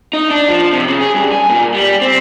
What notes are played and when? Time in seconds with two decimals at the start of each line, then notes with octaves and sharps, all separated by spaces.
0.13 D#4
0.31 D4
0.48 F3
0.73 C3
0.87 C#3
1.01 G#4
1.14 G2
1.32 G#5
1.49 A#2
1.74 G3
2.01 C4